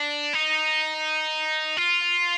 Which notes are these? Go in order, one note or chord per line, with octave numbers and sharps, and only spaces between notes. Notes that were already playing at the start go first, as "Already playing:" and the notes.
Already playing: D4
D#4
F4